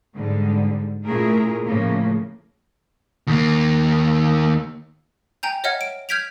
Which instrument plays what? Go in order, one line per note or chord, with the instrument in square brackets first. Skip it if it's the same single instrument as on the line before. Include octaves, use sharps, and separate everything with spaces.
[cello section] G#2 D3 G3
A#2 A3 C#4 E4 G#4 A#4
A2 C#3 F3 A#3 C#4
[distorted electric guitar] D#2 A#3
[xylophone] G5 G#5 A#5 G6
C#5 D#5 E5 F#5 F6 G#6
D7
F6 G6 G#6 B6 D7 F7